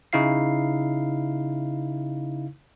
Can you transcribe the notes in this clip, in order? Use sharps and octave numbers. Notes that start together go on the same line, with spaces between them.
C#3 D#4 E4 F5 C7